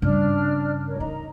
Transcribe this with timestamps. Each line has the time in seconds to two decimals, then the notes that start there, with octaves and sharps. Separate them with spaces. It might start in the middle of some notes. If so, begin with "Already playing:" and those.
0.02 G2 C#3 D4 F6
0.86 A#4 C#5
1.00 D#4 D#5 A#5